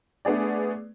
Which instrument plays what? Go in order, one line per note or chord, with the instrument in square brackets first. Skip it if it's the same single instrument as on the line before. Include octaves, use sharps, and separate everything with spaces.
[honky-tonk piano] A3 B3 D4 G#4 D5